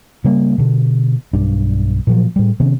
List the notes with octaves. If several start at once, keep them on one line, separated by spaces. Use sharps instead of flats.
C#3 G3 A#3
B2 D3
B1 G2 D4
A#2 F3 F#3
A2 G3
C3 D#3 B3 C#4